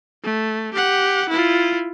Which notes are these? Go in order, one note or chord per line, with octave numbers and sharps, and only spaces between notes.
A3
G4 F#5
E4 F4